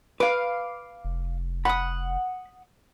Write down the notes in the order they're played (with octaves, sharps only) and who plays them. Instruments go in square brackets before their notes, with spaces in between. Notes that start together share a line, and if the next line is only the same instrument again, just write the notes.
[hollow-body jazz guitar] B4 [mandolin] F5 D6
[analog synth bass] F1
[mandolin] F#5 D#6 [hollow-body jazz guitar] B5